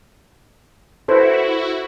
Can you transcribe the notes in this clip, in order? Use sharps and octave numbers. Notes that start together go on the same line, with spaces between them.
E4 F#4 A4 B4 C5